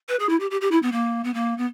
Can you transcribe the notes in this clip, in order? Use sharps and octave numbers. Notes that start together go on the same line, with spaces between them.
B4
G#4
E4
G4
G4
G4
E4
B3
A#3
B3
A#3
B3